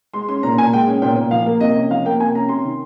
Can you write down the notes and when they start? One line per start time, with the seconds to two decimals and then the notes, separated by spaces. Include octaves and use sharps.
0.14 G#3 C6
0.29 C#4 C6
0.43 A#2 A#5
0.58 A#2 G#5
0.72 G#3 G5
0.87 C#4
1.02 A#2 G5
1.17 A#2
1.31 F3 F5
1.46 A#3
1.60 C3 D#5
1.75 C#4
1.91 F3 F5
2.05 A#3 G5
2.20 C3 G#5
2.35 C#4 A#5
2.49 C3 C6
2.64 D#3